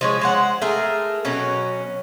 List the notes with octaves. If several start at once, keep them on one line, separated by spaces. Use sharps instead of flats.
F3 G#3 C#5
G#3 C5 F#5
A3 G#4 A#4
B2 F#3 C#4